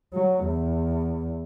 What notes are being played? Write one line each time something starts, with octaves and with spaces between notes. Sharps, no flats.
F#3
E2